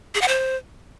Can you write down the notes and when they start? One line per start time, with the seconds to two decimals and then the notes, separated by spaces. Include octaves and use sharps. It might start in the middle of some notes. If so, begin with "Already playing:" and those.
0.15 G#4
0.21 F#5
0.28 C5